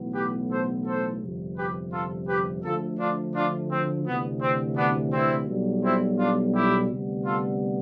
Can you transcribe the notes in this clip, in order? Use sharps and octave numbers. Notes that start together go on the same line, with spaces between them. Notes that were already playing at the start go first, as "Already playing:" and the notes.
Already playing: B1 A2 E3 B3
G4 B4
A4 C5
A4 C5
G1 F2 C3
G4 B4
F4 A4
G4 B4
D2 D3 F3 A3 F4 A4
D4 F4
D4 F4
C4
D2 C3 E3 B3
C4
B3 D4
C4 E4
B1 B2 G3
C4 E4
D4 F4
E4 G4
D2 C3 G3 B3
F4 A4